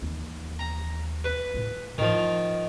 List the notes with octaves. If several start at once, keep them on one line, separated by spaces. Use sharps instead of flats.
D#2 E3
A#5
B4
A2 E4
A2 D#3 F3